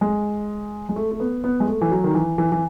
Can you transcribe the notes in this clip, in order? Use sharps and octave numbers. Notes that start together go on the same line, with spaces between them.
G#3
G#3
A3
A3
B3
B3
G#3
A3
E3
F#3
D#3
E3
E3
E3